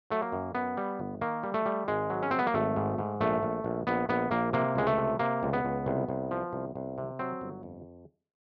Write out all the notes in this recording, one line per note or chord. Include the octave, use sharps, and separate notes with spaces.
F#3 A3
A#3
F#2
F#2 B3
G3
G1
D#3 A#3
G3
A3
G3
G#1 G#3
F#3
C#4
F#3 C4
B3
A#3
G#1 A3
G#2
G#2
A#1 A3
A#1
A#1
A#1 B3
A#1 B3
A#1 A#3
C3 A#3
C#2 G#3
A3
C3
C3 A#3
C#2
B3
C#2
C2
C2
F3
C2
C2
C3
F#3 C4
G1
F2